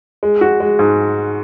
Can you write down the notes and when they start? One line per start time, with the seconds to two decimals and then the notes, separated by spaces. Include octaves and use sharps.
0.23 G#3
0.41 F#4
0.60 G#3
0.79 G#2